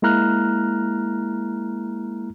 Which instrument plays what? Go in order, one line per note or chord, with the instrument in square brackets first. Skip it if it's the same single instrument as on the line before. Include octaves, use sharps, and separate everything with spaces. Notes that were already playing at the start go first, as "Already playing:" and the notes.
[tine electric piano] G#3 A#3 E4 A#5 F6 F#6